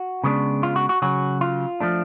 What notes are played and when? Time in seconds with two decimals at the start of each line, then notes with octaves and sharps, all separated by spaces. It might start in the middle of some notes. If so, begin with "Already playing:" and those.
Already playing: F#4
0.24 C#3 G#3 B3 D4
0.63 F4
0.76 F#4
0.89 F#4
1.02 C#3 F#3 C#4 F#4
1.41 F4
1.80 F3 A3 D4